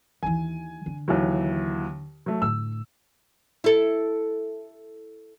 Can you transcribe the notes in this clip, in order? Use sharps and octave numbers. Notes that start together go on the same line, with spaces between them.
D#2 E3 G#5
D3
D#2 E3 F#3
F#3 A3
A2 D3 E6
E4 A4